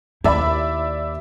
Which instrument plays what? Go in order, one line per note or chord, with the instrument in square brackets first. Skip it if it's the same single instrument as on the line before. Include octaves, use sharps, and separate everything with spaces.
[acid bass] D#2 [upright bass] E4 [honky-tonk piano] D5 E5 B5